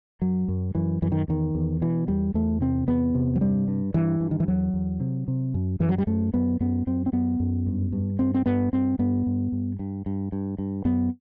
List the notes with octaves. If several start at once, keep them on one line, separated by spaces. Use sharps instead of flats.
F#2 F#3
F#2
F#2 E3
F#2 E3
D#3
E2 D#3
E2
B2 E3
E2 G3
E2 A3
C3 C4
E2 B3
C3
F#3
G2 G3
G2
G2 E3
G2
D#3
E3
E2 F#3
E2
C3
C3
F#2
F#2 E3
F#3
G3
F#2 A3
F#2 B3
F#2 B3
F#2 C4
C4
F#2 B3
F#2
G2
G2
G2 C4
C4
G2 B3
G2 C4
G2 B3
G2
G2
G2
G2
G2
G2
F#2 B3